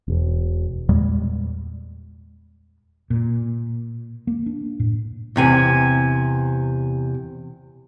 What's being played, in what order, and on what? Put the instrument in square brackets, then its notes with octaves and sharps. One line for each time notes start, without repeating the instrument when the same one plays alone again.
[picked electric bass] E1
E2 A#2 G3 G#3
[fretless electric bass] A#2
A#3
D4
A2
[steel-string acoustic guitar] E2 C3 G#5